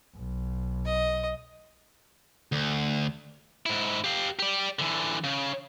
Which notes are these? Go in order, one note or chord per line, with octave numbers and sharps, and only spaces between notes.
B1
D#5
D2
G#2 E4
G4 F5
G4 D5
D3 E3
C#3